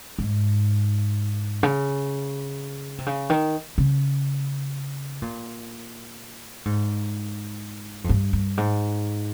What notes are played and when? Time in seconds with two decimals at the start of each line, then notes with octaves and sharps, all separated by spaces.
0.19 G#2
1.63 C#3
2.98 C3
3.06 C#3
3.30 D#3
3.78 C#3
5.22 A#2
6.65 G#2
8.04 F2
8.09 G2
8.33 G2
8.57 G#2